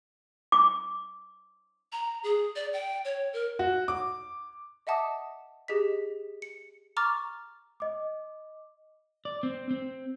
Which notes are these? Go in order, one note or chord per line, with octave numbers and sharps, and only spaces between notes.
D6
A#5
G#4
D5
G5
C#5
A#4
F#4
D6
D#5 E5 F#5 A5 D6 D#6
G4 G#4 D#5 B6
C#7
A#5 C#6 D6 F6 A6
D#5 D6
D5
C4
C4